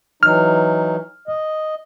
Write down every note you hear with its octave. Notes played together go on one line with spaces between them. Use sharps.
E3 F#3 D#4 F6
D#5